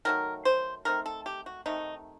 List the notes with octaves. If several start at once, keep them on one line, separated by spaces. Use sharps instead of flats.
D#3 F#3 A3 A#4
C5
D#3 A3 C4 D#4 A#4
A4
G4
F#4
C3 D#3 A3 D#4